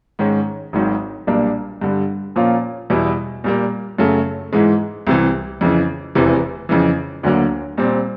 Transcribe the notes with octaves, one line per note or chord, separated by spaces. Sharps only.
G#2 D#3 G#3 C#4
G#1 G#2 D#3 F#3
B1 A#2 G3 A#3 D4
G2 D3 G3
A#2 F3 A#3 C#4 F4
E2 B2 G3 B3 E4
A#2 G3 A#3
F#2 C#3 F#3 A3
G#2 E3 G#3
C2 C3 E3
F2 C#3 E3
F1 E2 C3 E3
F2 C#3 E3
D2 D3 F#3 A#3
A#2 G3 C4